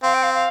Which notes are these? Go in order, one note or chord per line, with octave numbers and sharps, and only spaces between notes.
C4 F5
G5
F5
F5